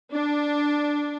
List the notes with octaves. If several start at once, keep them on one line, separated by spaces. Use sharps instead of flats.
D4